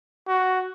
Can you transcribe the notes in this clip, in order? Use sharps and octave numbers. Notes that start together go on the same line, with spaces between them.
F#4